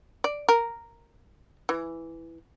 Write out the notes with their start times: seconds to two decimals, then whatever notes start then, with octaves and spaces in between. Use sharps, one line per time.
0.24 D5
0.49 A#4
1.69 E3